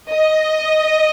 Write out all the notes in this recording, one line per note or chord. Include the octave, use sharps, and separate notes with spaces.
D#5